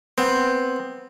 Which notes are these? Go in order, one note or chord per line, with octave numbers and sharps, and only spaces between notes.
B3 C4